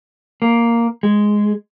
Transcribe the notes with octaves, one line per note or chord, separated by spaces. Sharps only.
A#3
G#3